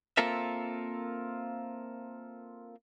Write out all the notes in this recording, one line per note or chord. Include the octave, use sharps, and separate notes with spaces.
A#3 C4 F4 A4 A#4 E5